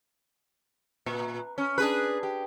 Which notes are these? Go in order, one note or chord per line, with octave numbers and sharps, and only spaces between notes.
A#2
C#4
D4 G#4 B4
G4